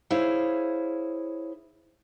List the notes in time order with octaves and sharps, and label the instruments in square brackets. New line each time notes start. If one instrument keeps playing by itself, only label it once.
[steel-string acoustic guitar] E4 G#4 C5 C#5 F5